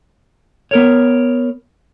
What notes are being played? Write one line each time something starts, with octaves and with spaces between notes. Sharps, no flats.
B3 A#4 C#5